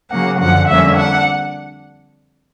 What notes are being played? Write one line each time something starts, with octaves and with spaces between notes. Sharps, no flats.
C#3 F#3 A#3 F#5
F#2 D3 F3 F#5
F2 D3 G3 A#3 C#4 E5
D4 F#5